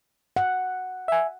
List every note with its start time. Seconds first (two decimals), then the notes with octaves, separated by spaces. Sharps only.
0.36 F#5
1.08 E5 G#5